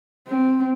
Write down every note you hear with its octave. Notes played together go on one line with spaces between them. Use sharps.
C4